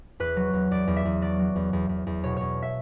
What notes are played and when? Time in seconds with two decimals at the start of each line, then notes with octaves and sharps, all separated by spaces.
0.20 E2 B4
0.36 F#3
0.53 E2
0.71 E2 D5
0.87 E2
0.96 E5
1.05 E2
1.21 F#3 D5
1.39 F#3
1.56 E2
1.73 E2
1.89 E2
2.07 E2
2.24 B2 C#5
2.36 E2 C#5
2.62 E5